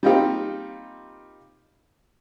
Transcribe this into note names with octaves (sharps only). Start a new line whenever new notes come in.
G3 A#3 C4 D#4 F4 G4